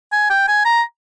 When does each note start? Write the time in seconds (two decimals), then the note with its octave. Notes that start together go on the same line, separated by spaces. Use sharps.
0.12 G#5
0.30 G5
0.48 G#5
0.65 A#5